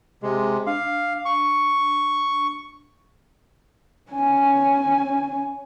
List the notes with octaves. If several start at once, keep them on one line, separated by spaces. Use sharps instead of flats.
C3 G#3
D4 F5
C#6
C#4 G#5